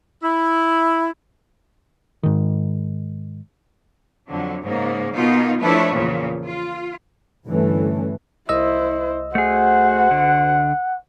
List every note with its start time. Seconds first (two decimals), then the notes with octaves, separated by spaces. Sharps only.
0.23 E4
2.23 G#2 D#3
4.28 F2 D3 F#3
4.62 G#2 C#3 A#3
5.15 B2 A#3 B3 D#4 F4
5.60 F3 A3 D4 E4 B4 C#5
5.93 E2 A#2 C#3 F3
6.44 F4
7.47 D2 G2 E3 A3 C#4
8.49 C2 E4 C5 D#5 E6
9.35 A3 F#4 G#4 C5 F#5
10.11 D3